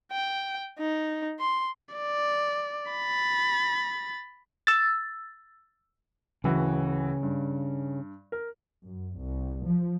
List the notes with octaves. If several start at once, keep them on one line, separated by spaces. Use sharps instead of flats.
G5
D#4
C6
D5
B5 A6
E6 A6
D1 C#3 E3 F#4
G2
A#4
F#2
C2
F3